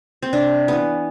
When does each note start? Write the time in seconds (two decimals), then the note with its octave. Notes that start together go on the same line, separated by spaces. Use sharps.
0.22 C4
0.33 C3 D4
0.68 E3 B3